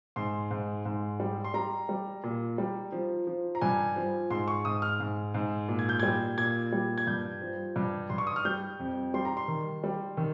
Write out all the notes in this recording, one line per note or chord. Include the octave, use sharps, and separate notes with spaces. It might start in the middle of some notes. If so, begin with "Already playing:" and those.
G#2 C6
G#2
G#2
G3
C6
G3 A#5
G3
A#2
G3
F3
F3
A#5
G2 G#5
F3
G#2 C6
C#6
G#2 D#6
F6
G#2
G#2
A#2
G#6
G6
G3 G#6
A#2 G#6
G3
G#6
G2 G6
F3
G2
G2 C6
C#6
D#6
F6
G3 G6
F2
G3 C6
A#5
C6
D#3
G3
D#3